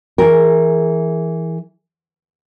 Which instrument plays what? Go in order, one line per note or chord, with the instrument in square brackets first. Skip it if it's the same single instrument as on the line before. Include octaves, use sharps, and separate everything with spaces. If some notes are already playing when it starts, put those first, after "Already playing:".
[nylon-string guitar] E3 G#4 A#4